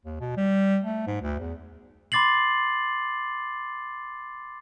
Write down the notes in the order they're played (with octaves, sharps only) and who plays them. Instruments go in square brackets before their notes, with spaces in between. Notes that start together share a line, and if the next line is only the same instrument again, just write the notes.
[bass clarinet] D#2
B2
G3
A3
G#2
D2
E2
[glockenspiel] B5 C6 D6 A6 C7 F#7